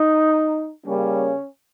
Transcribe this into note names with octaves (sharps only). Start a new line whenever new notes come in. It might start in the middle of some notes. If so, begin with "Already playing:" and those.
Already playing: D#4
C#3 G3 A#3 C#4